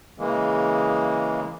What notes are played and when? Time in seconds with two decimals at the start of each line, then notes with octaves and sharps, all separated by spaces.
0.19 C#3 E3 G#3 A#3